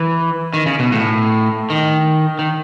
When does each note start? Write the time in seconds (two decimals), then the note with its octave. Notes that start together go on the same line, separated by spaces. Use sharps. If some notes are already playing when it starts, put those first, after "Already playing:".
Already playing: E3
0.54 D#3
0.66 C#3
0.79 B2
0.92 A2
1.70 D#3
2.39 D#3